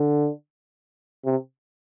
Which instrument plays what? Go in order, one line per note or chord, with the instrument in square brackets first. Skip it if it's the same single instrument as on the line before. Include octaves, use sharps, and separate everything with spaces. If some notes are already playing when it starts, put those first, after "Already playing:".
Already playing: [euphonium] D3
C3